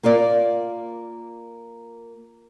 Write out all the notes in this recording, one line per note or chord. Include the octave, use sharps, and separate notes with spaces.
A#3 F4 A#4 D5